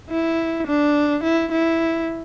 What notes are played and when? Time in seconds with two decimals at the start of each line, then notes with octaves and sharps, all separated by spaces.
0.10 E4
0.67 D4
1.23 E4
1.52 E4